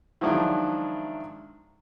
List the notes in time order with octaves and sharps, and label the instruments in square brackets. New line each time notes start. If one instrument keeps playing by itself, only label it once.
[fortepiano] D#3 F3 F#3 G#3 D4 E4